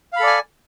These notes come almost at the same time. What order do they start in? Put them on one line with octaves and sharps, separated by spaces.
F5 B5 A4 D5 G#5